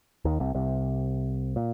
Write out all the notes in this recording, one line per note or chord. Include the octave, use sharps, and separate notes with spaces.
D#2 D#3
C2 C3
C2 C3
A#2